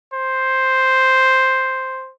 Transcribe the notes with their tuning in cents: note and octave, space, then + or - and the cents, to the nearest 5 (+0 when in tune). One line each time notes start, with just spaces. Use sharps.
C5 +0